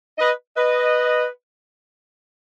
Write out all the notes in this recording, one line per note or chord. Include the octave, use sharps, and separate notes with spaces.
B4 D#5
B4 D#5